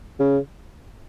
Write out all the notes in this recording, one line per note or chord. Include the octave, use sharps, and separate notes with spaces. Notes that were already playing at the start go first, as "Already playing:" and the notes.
C#3